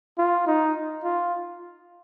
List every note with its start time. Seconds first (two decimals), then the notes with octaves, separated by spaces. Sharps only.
0.18 F4
0.47 D#4
1.04 F4